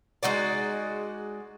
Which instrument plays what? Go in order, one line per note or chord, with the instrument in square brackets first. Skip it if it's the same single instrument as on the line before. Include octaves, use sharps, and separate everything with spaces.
[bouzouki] G#3 D#4 F#4 D5